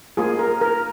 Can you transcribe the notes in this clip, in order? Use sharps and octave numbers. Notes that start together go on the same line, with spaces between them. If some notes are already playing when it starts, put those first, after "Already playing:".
A#3 F4 G#4
A#4
A#4